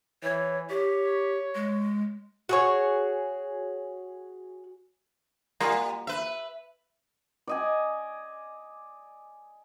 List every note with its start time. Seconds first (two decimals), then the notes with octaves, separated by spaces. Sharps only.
0.23 E3 C#5
0.70 G4 C#5
1.55 G#3
2.49 F#4 G#4 C#5
5.60 G3 A#3 F4 F#4
6.07 B4 E5
7.47 D5 D#5 G#5